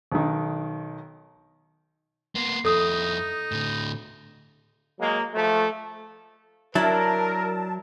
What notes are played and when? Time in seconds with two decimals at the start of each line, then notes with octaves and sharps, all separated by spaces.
0.12 B1 D#3
2.35 A#3 B3 C6
2.65 F2 D#4 E4 A4 D#6
3.52 A2 D3
4.99 F#3 G#3 A#3
5.34 F3 A3
6.75 F#3 D4 E4 A#4 A5